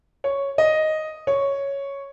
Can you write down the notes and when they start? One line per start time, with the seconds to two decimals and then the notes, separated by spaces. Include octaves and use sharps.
0.24 C#5
0.58 D#5
1.27 C#5